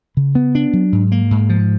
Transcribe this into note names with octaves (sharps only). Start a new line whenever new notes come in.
C#3
B3
D4
F#3
G#2
A#3
G#2
F3